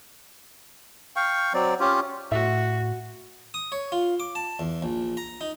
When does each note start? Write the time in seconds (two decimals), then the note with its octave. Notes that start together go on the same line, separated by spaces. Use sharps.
1.16 F5 G5 C#6
1.54 F#3 C4 D5
1.80 C#4 F4 G4
2.32 A2 F#4 E5
3.54 D#6
3.72 C#5
3.92 F4
4.20 D6
4.35 A5
4.59 E2
4.82 A#1
5.17 A#5
5.41 D#4